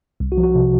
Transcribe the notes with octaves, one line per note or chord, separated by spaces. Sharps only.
C2
F#4
F3
F#4
C3